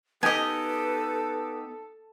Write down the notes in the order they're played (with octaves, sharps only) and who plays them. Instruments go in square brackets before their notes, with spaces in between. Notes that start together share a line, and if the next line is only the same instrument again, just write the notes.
[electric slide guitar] B3 D#4 G4 [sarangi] A4 [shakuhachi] B4 [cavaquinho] D#5 G#5